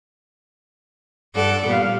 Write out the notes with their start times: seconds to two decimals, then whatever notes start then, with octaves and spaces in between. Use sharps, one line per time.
1.35 G2 A4 D5 F#5
1.67 A#2 G3 B3 F5